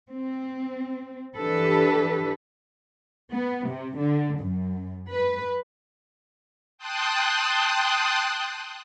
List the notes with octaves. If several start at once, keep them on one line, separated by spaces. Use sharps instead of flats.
C4
E3 D4 G4 A4 B4
B3
C3
D3
F#2
B4
G5 A5 C6 D#6 F#6